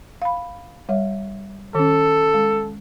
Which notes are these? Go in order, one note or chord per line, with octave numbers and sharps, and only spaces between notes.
F5 B5
G3 C#5 E5
D#3 C#4 A4
G#3